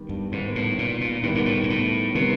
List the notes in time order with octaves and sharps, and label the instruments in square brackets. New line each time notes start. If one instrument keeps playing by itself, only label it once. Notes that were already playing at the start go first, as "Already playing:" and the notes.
Already playing: [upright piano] D#3 G3 B3
[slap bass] G2
[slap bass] G#2 [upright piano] D#3 G3 B3
[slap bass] A2
A#2
A#2
[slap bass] A2 [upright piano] D#3 G3 B3
[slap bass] G#2
A2
G#2
A2
[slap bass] C3 [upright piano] D#3 G3 B3